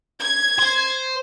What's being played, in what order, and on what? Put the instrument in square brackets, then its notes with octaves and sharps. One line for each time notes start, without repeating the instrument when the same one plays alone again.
[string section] G#6
[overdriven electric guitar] C5